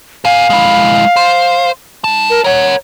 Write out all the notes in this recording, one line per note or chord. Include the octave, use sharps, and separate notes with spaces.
A#4 F5 G#5
G#3 E4
C5
D#4 A5
A#4
A#4 C#5 F#5